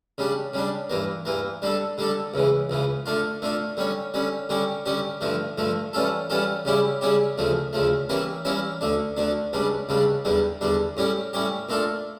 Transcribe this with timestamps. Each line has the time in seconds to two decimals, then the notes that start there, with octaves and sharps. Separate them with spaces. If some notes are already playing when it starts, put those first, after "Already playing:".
0.18 C#3 G3 D4
0.54 C#3 G3 D4
0.90 G2 E3 A#3
1.25 G2 E3 A#3
1.62 D3 G3 D4 A4
1.98 D3 G3 D4 A4
2.34 C#2 C#3 E3
2.70 C#2 C#3 E3
3.06 D3 A3 D4 F4
3.42 D3 A3 D4 F4
3.77 D3 G3 C#4
4.14 D3 G3 C#4
4.49 D3 G3 C#4 G4
4.86 D3 G3 C#4 G4
5.21 G2 D3 F3 A3
5.58 G2 D3 F3 A3
5.93 E3 G3 C#4 F4 A4
6.30 E3 G3 C#4 F4 A4
6.65 C#3 G3 C#4 E4 G4
7.01 C#3 G3 C#4 E4 G4
7.38 D2 C#3 F3 A3
7.73 D2 C#3 F3 A3
8.09 E3 G3 A#3 C#4 E4
8.45 E3 G3 A#3 C#4 E4
8.81 D2 D3 A3 D4
9.17 D2 D3 A3 D4
9.53 C#2 C#3 G3 D4
9.89 C#2 C#3 G3 D4
10.25 E2 D3 G3 D4
10.61 E2 D3 G3 D4
10.97 A2 G3 C#4 G4
11.33 A2 G3 C#4 G4
11.69 A#2 A3 D4 F4 A4